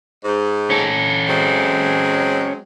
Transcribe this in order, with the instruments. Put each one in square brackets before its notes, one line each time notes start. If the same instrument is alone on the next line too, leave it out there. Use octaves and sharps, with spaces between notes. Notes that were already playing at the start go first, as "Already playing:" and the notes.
[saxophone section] G#2
[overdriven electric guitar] C#4 A4
[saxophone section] F#3 G#3 C4